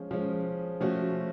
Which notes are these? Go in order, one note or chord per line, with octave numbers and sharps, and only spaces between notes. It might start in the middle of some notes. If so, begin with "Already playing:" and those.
Already playing: F3 G#3 C#4
F3 G#3 C#4
F3 A3 C#4 F#4